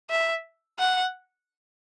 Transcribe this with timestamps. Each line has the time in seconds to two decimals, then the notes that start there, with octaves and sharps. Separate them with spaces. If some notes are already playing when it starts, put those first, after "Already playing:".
0.10 E5
0.79 F#5